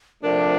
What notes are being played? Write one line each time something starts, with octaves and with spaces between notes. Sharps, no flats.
C3 F3 A3 D4 A#4